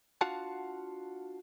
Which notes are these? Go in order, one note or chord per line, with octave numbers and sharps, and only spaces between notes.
D4 F4 F#4 F5 F#5 A5